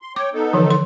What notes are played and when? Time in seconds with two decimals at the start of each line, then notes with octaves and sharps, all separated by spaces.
0.02 C6
0.16 C#5 G5 D6
0.34 B3 D#4 A4
0.53 D3 E3 F3
0.70 C6